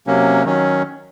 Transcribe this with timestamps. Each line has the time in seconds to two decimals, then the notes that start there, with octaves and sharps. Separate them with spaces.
0.07 C3 F#3 A#3 C#4
0.45 D#3 F#3 C#4